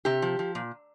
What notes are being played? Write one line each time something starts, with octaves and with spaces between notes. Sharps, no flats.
C3 G4
F3
F3
A#2